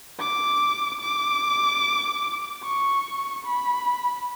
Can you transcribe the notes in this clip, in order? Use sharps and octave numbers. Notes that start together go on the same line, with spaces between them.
D6
D6
C#6
B5